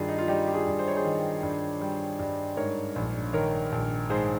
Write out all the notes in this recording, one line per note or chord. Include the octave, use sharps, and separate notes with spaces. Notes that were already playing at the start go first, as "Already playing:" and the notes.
Already playing: G2 D#3 F4 G#4
D#4
F4
G3 D#4 G4
G4
F4 G#4
G2
C5
C#5
G#4 C5
D#3
G2
G3
G2
G#2 A#4 C#5
A#1
D#3 A#4 C#5
A#1
G#2 G#4 C5